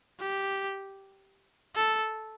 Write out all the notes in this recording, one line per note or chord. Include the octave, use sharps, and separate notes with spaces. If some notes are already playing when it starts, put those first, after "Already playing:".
G4
A4